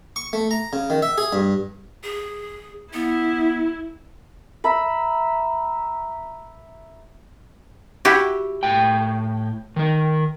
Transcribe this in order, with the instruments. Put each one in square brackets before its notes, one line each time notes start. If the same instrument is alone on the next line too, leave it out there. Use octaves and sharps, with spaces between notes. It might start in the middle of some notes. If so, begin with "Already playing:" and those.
[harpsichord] C#6
A3
A#5
C#3
D#3
E5
G#4
G2
[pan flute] G#4
[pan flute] B3 [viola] E4
[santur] E5 A#5 B5
[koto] E4 F#4 G4
[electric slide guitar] A2 G5
D#3 A#4